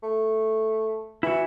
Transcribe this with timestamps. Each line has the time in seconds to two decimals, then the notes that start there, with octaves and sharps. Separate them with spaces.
0.03 A3
1.23 E3 E4 F#4